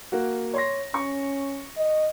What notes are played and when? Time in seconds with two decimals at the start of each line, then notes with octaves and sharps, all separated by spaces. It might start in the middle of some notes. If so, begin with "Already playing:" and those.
0.12 A#3 F#4
0.54 C#5 C6 A#6
0.94 C#4 C#6
1.77 D#5